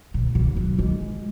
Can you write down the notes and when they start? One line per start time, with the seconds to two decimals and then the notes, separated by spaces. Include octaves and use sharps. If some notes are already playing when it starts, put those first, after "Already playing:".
0.14 B2
0.35 C#3
0.56 F#3
0.79 G#3